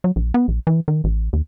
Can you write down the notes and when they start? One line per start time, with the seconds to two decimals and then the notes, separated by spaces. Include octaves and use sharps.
0.04 F#3
0.16 A#1
0.34 B3
0.48 A#1
0.67 E3
0.88 D#3
1.04 A1
1.33 D#2